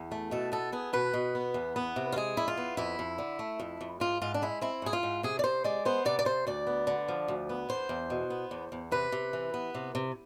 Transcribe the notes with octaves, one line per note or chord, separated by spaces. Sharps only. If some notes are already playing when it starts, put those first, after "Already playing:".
Already playing: E2
A3
B2 A4
B3 A4
B3 G#4
B2 B4
B2
B3
E2
B3
C3
F4
G#3 G#4
E2 E4
F4
B3
F2 E4
F2
D3
A3
F2
F2
G#2 F4
G#2 F4
D4
G#3 E4
C4 E4
G#2 G#4
F4
G#2
C3 G#4
D5
C3 C5
G#3 D5
B3 C5
C3 D5
D5
C3 C5
D2 D5
B3
D3
F3
D2
B3
E2 C5
E2
B2
B3
E2
E2
C3 B4
C3
E3
B3
C3
C3